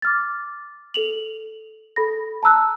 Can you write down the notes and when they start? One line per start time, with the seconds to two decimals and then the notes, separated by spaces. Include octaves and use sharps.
0.02 D6 F6 A6
0.94 A4 F7 F#7
1.96 A4 B5 A#6
2.43 A5 A#5 E6 F#6